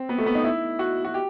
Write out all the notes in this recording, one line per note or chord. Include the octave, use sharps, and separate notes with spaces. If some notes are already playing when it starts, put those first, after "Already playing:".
Already playing: C4
B3
A3
B3
D#4
E4
F#4
F#4
G4